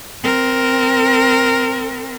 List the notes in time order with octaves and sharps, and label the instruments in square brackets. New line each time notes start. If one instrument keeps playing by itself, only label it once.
[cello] C4 A#4